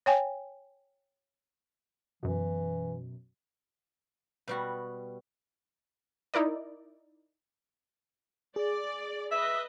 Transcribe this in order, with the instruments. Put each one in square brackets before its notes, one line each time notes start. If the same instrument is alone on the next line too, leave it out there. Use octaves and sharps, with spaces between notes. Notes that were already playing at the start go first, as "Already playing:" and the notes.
[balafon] C#5 G5 G#5
[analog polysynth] F#2 B2 [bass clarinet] E3
[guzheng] B2 G3 F#4
[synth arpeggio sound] D#4 E4 A#4 D5
[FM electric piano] G#4 [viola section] D5
[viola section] B4 D#5 [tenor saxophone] E5